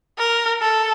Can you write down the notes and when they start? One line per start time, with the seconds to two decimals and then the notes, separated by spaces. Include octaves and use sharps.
0.18 A#4
0.61 A4